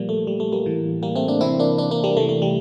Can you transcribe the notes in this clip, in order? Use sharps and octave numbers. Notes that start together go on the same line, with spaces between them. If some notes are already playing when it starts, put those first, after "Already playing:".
Already playing: A#2 F3 G3 A#3
A3
G3
A3
G3 A#3
A2 E3
G3 A#3
A3 C4
A#3 D4
C3 E3 C4 E4
A#3 D4
A#3 D4
A#3 D4
G3 A#3
C3 E3 A3
A3
G3